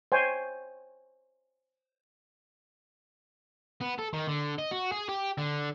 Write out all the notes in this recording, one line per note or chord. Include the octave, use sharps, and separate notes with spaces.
C5 C#5 D#5 G5 G#5
B3
A4
D#3
D3
D#5
F#4
G#4
G4
D3